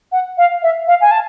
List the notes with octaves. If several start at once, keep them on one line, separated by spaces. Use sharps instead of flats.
F#5
F5
E5
F5
G#5
A5